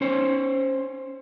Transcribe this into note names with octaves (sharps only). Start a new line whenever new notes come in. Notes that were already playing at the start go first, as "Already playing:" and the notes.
C#4 C5 C#5